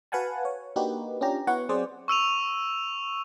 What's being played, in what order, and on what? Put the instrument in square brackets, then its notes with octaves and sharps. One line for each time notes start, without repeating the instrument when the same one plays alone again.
[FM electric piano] F#4 B4 F5 F#5 G#5 A5
C#5
A#3 D4 D#4 F#4 G4 B4
C#4 D4 F4 G4 A#5
B3 E4 F#4 C#5 F#5
F#3 C4 G#4 C5 D5
[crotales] C#6 E6 D#7 F7